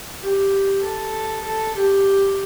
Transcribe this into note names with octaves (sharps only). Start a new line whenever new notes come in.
G4
A4
A4
G4